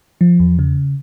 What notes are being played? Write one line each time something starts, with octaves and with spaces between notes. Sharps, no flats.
F3
E2
C#3